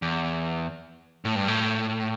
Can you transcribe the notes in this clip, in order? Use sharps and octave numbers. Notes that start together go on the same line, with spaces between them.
E2
A2
G2
A2